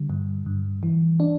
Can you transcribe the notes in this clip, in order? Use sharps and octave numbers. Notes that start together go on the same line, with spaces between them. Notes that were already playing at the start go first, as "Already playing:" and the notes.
Already playing: D3 G3
G2
G2
E3
D4